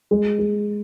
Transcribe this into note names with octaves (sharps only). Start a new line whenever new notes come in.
G#3
G#3